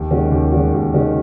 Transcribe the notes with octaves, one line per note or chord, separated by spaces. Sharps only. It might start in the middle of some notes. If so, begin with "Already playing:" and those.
Already playing: D#2
D#3 G#3 C#4 F#4
D#2
D#3 G#3 C#4 F#4
D#2
D#3 G#3 C#4 F#4